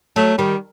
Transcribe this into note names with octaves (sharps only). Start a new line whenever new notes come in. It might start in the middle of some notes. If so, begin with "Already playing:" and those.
F#3 A3
D#3 G3